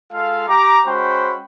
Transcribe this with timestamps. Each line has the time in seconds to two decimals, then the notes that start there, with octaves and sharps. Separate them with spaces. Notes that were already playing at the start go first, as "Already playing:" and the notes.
0.13 G#3 F4 A4 F5
0.49 G4 A#5 D6
0.86 G#3 C#4 F#4 C5 G5 B5